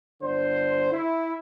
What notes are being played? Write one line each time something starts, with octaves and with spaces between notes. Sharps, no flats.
G1 D3 C5
E4